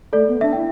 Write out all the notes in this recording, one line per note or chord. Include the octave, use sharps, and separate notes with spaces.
A3 A4 D5
B3
D4 E5
E4 G5